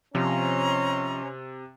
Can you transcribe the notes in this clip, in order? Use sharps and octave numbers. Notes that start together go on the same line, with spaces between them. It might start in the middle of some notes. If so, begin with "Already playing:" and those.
C3 F3 C#4 D#5 A#5 C6